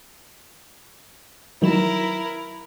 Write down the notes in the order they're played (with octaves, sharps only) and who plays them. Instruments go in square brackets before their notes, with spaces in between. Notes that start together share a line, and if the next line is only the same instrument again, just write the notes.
[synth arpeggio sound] D#3 F#3 E7 [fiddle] E4 A#4